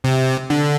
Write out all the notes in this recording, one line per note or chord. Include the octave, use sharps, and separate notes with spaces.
C3
D3